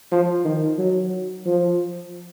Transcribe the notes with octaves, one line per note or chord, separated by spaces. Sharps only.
F3
D#3
F#3
F3